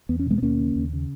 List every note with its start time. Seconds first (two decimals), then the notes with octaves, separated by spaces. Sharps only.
0.09 E2 B3
0.19 C#4
0.26 B2 G#3 B3
0.38 B3
0.42 D#2 A#3 C#4
0.60 C#3
0.76 D#2
0.93 C#3